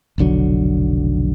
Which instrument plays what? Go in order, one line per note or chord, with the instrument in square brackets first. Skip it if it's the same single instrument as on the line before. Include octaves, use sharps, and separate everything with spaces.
[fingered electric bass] F1 B1 D3 F#3